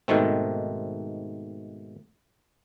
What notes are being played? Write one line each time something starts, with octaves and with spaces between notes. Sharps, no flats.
G#2 B2 D#3 A3 C4